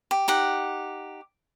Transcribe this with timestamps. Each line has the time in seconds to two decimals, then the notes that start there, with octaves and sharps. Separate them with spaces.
0.11 G4
0.28 D#4 G4 F#5